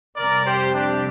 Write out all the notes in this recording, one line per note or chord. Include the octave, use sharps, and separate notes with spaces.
F2 C3 G3 C4 A#4 D5
G4 C5
D4 G4